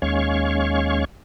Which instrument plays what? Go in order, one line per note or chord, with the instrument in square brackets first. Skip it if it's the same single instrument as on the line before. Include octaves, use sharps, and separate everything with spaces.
[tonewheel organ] D#2 G#3 C#4 C#5 F5 C#6